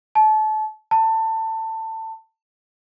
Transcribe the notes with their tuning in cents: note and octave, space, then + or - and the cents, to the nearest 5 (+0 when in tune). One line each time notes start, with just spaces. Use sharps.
A5 -30
A5 +20